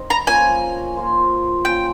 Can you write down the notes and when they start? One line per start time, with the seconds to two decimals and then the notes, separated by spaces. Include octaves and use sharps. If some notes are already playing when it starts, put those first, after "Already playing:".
Already playing: C4 D#4 A#4 D#5
0.10 A#5
0.27 F3 A#3 C#4 G#5
0.96 A#3 F4 C5
1.65 A#3 C#4 F4 G5